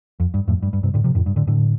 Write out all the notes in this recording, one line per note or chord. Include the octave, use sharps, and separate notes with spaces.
F2
G2
F2 A2
G2
G2
G2 C3
A2 D3
C3 F3
F2 A2
G2
A2 D3
A2 D3